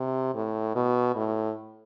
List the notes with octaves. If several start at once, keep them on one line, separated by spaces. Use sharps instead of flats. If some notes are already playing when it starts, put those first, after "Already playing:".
Already playing: C3
A2
B2
A2